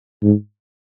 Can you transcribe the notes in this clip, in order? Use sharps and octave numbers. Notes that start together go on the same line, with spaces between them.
G#2